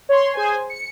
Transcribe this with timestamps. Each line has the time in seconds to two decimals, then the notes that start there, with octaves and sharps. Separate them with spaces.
0.09 C#5 C6
0.33 G#4 C5 G#5
0.70 C#7